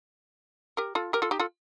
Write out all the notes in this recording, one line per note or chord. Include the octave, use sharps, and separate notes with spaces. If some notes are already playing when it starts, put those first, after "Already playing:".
G4 A#4
F4 A4
G4 A#4
F4 A4
D#4 G4
F4 A4